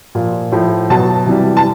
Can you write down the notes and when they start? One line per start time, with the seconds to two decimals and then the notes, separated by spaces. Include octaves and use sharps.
0.15 A#2 F3
0.52 A2 F3
0.90 B2 F#3 A5
1.27 C3 E3 G3
1.57 A5